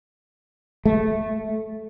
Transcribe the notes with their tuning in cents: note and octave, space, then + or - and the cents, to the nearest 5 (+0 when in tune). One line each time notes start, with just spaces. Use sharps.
A3 -10